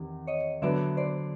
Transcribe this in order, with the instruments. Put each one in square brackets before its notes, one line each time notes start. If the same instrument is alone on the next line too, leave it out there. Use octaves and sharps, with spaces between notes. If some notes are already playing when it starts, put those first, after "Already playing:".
Already playing: [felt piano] E2 C3 D#3
[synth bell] C#5 D#5
[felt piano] D3 F#3 B3 [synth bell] D5 E5
[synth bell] C5 D5